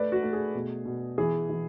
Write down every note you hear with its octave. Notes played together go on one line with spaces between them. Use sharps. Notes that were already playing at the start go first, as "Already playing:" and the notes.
Already playing: A3 B4 D5
F#4
A3
G#4
B2
B2
E3 G#4
E3